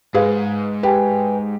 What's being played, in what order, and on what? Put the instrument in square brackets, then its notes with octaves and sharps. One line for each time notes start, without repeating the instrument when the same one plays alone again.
[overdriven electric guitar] G#2 [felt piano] G#4 B4 F5
[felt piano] G4 [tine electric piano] B4 G5 G#5